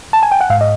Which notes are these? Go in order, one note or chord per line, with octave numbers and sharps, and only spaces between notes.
A5
G#5
G5
F#5
G#2 F5
D#5